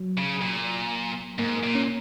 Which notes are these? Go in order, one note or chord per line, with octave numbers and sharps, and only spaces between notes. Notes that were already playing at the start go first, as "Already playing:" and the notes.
Already playing: F#3
C#3
A#2
G#2 A#3
A#3
A#2
C#4